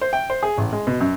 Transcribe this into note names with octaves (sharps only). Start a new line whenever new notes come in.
C5
G5
C5
G#4
A1
G#3
B2
F#2